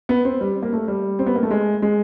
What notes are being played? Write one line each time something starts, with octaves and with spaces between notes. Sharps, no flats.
B3
C4
G3
A#3
A3
G3
C4
B3
A#3
A3
G#3
G#3